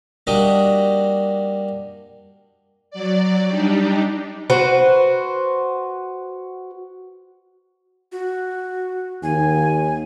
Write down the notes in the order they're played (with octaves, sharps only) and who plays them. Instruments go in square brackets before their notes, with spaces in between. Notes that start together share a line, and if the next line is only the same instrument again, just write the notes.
[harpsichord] G3 A#3 D4 F#4 G4 D#5
[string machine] F#3 D5
G3 D4 D#4 G4
[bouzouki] F#4 B4 C5
[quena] F#4
[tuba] D#2 [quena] G#5